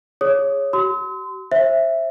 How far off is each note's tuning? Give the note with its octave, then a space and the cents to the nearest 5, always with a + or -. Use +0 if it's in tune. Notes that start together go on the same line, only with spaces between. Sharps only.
G#4 +0 C#5 +0 D#6 +0
F#4 +45 C6 -30 E6 -45
C5 +35 E5 +0